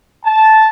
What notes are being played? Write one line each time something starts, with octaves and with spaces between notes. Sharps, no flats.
A5